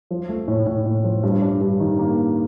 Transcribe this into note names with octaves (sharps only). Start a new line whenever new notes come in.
F3
A3
A2
A2
A2
F3
G2
D4
G2
D#3
A#3